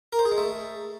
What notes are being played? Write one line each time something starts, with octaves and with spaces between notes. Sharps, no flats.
A#4
C5
G#4
G#3
A3